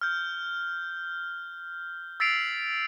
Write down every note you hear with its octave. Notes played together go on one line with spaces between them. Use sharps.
F6 G6
E6 A6 B6 C7 D7 F7